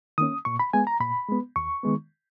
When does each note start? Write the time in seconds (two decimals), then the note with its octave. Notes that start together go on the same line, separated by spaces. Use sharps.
0.18 D#3 A#3 C#4 D#6
0.45 A#2 C#6
0.59 B5
0.73 G#3 B3 G#5
0.87 A#5
1.00 A#2 B5
1.28 G#3 B3
1.56 D#2 C#6
1.83 D#3 G#3 B3